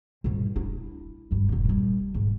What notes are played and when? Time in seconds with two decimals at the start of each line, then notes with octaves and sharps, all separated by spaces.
0.24 A#1 G2
0.56 D4 E4
1.31 G#1 G2
1.49 E1 D3
1.65 A#2 G3
2.14 G#2